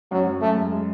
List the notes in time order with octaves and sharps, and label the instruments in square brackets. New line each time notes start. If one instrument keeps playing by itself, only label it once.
[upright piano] F#2 [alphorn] F#3
[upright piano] F#2
[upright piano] F#2 [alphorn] A3
[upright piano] G#3
G#3